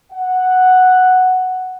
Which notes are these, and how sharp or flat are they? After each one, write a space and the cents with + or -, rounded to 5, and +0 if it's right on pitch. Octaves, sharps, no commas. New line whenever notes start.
F#5 +0